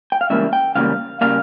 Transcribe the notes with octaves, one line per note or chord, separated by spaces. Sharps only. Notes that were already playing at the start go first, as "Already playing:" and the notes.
G5
F5
C#2 C#3 E3 G3 A#3 E5
G5
C#2 C#3 E3 G3 A#3 F5
C#3 G3 A#3 F5